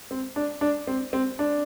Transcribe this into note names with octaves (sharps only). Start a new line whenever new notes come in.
C4
D4
D4
C4
C4
D4